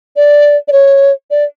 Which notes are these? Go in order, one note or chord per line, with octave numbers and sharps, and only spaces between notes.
D5
D5
C#5
D5